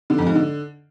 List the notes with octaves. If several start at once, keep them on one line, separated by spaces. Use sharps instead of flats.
D3
F2
G#2
D3